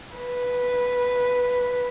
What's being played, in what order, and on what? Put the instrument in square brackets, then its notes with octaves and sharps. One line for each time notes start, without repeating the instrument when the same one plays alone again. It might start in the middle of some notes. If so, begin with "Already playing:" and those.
[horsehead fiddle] B4